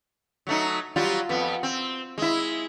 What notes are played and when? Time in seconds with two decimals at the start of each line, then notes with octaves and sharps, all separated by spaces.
0.47 F#3 A3 D#4
0.96 F#3 G3 F4
1.29 F2 B3
1.63 C4
2.18 G#3 E4